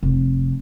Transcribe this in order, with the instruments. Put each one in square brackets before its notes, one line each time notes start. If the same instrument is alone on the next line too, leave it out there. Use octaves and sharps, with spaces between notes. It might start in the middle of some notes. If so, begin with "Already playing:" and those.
[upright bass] F1